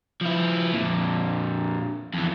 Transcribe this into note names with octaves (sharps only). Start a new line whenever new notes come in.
F3 E4
F2 A#2
F2 E3